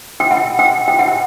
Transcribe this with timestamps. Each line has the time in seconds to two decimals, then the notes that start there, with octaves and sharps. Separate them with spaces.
0.20 G5
0.31 F#5
0.59 G5
0.88 G5
0.99 F#5
1.08 G5